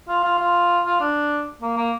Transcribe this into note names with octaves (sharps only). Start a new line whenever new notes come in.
F4
F4
F4
F4
D4
A#3
A#3